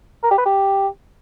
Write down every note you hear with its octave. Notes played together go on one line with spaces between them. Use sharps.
A#4
G4
B4
G4